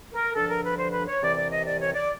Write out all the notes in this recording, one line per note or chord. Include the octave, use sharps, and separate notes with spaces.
A#4
G2 D3 F3 A4
A#4
B4
C5
B4
C#5
C2 C3 E3 D5
D5
D#5
D5
C#5
D5